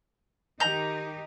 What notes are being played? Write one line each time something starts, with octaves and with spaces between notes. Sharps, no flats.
D#3 D#4 G4 A#5 G6